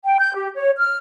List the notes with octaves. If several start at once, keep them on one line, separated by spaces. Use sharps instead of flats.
G5
G6
G4
C#5
F6